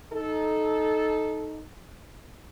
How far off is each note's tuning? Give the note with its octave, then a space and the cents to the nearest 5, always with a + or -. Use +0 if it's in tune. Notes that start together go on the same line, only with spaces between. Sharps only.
D#4 +0 A4 -15